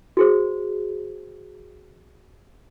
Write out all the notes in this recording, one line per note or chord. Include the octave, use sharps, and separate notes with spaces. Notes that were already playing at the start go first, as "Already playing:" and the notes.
F#4 G#4 C5